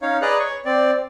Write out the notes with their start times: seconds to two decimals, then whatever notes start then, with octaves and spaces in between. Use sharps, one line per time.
0.02 C#4 D#4 C#5 F5
0.22 G#4 B4 D5 D#5 A#5 F#6
0.40 C#5 C#6
0.65 C4 D5